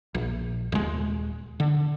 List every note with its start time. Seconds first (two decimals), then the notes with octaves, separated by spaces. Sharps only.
0.15 A#1
0.72 D#1 G#3
1.60 D3